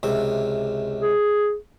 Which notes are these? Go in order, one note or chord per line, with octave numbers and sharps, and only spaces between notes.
C#2 C3 E5
G#4